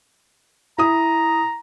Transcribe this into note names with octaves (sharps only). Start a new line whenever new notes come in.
E4 A#5 D#6